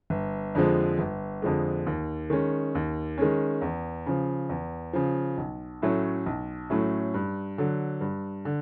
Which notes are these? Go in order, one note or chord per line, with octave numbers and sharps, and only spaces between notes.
G1
F2 D3 F3 G#3
G1
F2 D3 F3 G#3
D#2
D#3 G#3 C#4
D#2
D#3 G#3 C#4
E2
C#3 F3
E2
C#3 F3
B1
A2 F#3 A3 C#4
B1
A2 F#3 A3 C#4
G2
D3 F#3
G2
D3